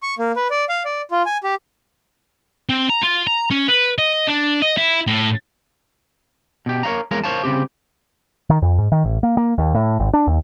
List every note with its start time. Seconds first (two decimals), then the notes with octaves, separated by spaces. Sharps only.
0.03 C#6
0.19 A#3
0.36 B4
0.51 D5
0.69 F5
0.85 D5
1.11 F4
1.26 G#5
1.44 G4
2.69 C4
2.90 A#5
3.02 F4
3.27 A#5
3.51 C#4
3.69 B4
3.98 D#5
4.27 D4
4.62 D#5
4.77 E4
5.07 A2
6.66 B2 G4
6.83 A#4 C#5 D#5 F5 A#5
7.11 E2 G#3 A#4 C#5 F5
7.24 A#4 C5 C#5 F5 A5
7.44 C#3 G3 C4 G4
8.50 D#3
8.62 F2
8.78 G#2
8.92 D#3
9.04 A1
9.23 A#3
9.37 A#3
9.58 D#2
9.74 A2
9.99 G#1
10.13 D4
10.27 D#2